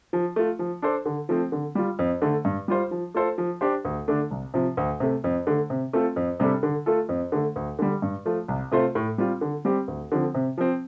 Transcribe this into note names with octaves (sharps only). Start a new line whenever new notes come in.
F3
A3 F4
F3
D4 A4 C5
D3
F3 A3 C4
D3
G3 F4
F2
D3 A3
G2
G3 F4 C5
F3
A3 F4 A4 C5
F3
D4 G4 C5
D2
D3 A3 D4
C2
C3 F3
D2
C3 A3
F2
D3 A3
C3
A3 C4 F4 A4
F2
C3 G3 D4 A4
D3
A3 F4 A4
F2
D3 A3
D2
D3 G3
G2
F3 A3 F4
C2
C3 A3 F4 C5
A2
G3 C4 F4
D3
G3 C4 G4
D2
D3 F3 C4
C3
F3 C4